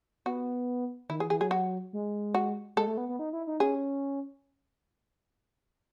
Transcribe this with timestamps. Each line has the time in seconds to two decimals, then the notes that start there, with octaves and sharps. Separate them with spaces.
0.26 B3 F#4
1.09 D#3 E4
1.19 E3 G#4
1.30 E3 G#4
1.41 F#3 G#4
1.51 F#4
1.93 G#3
2.34 F#4
2.76 G#3 A4
2.87 A3
2.97 B3
3.09 B3
3.19 D#4
3.33 E4
3.47 D#4
3.60 C#4 G#4